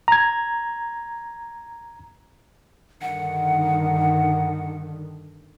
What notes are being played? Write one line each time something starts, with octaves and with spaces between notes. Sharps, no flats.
A#5 G#6
G2 D3 D#3 F#5